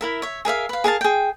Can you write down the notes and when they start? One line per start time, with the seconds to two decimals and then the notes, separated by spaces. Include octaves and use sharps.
0.01 E4 A#4 E5
0.22 C#5 E5
0.45 G#4 A#4 E5 F5
0.69 B4 F5
0.84 G#4 A#4 F5 A5
1.01 G#4 G5